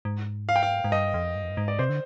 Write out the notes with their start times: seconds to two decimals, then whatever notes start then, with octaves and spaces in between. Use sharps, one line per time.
0.05 G#2
0.49 F5
0.56 G5
0.63 F5
0.84 G#2
0.92 G2 D#5
1.14 F2
1.36 G2
1.43 F2
1.50 G2
1.57 G#2
1.68 D5
1.79 C3 C5
1.89 D3